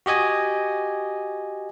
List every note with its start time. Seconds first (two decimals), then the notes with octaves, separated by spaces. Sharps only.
0.06 F#4 G4 D#5 G#5